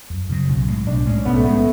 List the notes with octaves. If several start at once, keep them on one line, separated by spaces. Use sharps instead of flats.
F#2
C#3 F#3
B1
A2 G#3
B1 D4
A2 G#3 C#4
B1 B3
A3
A2 G#3 B3
A3